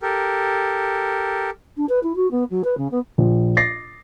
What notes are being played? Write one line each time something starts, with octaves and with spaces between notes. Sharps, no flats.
G4 A4 A#4
D4
B4
E4
F#4
B3
F#3
B4
C#3
B3
A#1
A6 A#6 C7